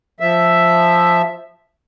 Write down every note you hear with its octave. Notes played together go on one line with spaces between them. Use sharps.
F3 E5